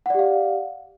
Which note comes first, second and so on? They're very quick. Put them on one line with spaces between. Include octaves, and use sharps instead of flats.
F#5 D5 G4 F5